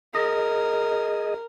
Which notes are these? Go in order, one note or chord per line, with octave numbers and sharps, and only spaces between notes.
G#4 A#4 D#5